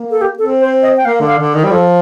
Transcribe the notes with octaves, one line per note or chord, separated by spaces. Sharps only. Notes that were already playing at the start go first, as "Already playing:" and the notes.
Already playing: A#3
A4
G4
C4 A4
C5
D#5
G5
A#3 F5
D3
F5
D3
D#3
G3
F3 A4